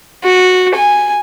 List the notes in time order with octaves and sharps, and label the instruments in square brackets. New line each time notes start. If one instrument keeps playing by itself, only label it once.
[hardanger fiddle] F#4
G#5